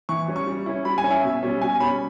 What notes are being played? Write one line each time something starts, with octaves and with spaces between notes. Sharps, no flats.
E3 C#6
G3 C#4
C#6
G3
C#4 E4
G3 B5
G#5
C#4
E4 E5
B2
G3 C#4
B2 G#5
G3 C#4 B5